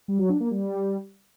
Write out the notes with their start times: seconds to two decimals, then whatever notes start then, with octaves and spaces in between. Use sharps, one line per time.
0.08 G3
0.19 F#3
0.30 D4
0.40 A#3
0.51 G3